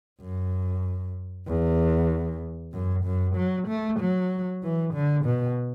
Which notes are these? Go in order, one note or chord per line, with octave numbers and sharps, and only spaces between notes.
F#2
E2
F#2
F#2
F#3
A3
F#3
E3
D3
B2